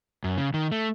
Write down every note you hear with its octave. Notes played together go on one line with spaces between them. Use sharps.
F#2
C#3
D#3
A3